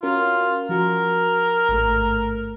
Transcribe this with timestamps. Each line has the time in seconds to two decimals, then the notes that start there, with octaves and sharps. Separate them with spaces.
0.03 C#4 F4 F#4 A#4
0.69 F3 F#4 A#4 A#5
1.69 A1 G#2 A3